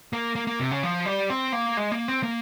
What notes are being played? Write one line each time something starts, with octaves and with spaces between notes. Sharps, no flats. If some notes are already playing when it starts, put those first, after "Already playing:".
A#3
A#3
A#3
C3
C#3
F3
G3
C4
A#3
G#3
A#3
C4
A#3